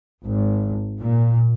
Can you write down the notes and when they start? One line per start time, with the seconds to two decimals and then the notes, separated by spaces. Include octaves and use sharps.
0.24 G#1
1.00 A#2